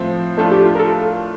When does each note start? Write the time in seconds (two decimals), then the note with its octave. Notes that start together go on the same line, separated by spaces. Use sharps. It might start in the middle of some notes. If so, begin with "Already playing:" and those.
Already playing: A2 F3 C4
0.37 A2 F3 A3 D4 F4 A4
0.51 G4
0.65 F4
0.75 A#4
0.79 A4